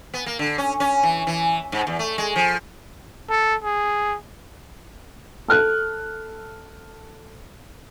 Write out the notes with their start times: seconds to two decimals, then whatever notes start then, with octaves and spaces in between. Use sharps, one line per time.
0.14 B3
0.26 A#3
0.39 D3
0.58 C#4
0.80 C#4
1.03 E3
1.27 E3
1.72 G#2
1.87 E2
1.99 A3
2.18 G#3
2.36 F3
3.30 A4
3.64 G#4
5.48 A4 F6 F#6